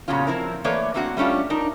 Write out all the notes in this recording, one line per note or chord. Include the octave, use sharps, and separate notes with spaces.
A#2 C#3 F#3 B3 C#4 F4
F3 C4 E4 A#4
E3 A3 A#3 B4 C#5 D5
A3 A#3 C4 D4 F#4 F#5
G3 A3 C#4 D4 F4
D4 D#4 A#4